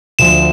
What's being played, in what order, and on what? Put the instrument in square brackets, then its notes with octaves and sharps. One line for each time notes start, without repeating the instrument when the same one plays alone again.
[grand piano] D2 D3 F3 [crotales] E7